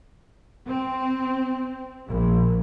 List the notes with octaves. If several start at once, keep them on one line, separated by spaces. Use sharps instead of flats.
C4
A#1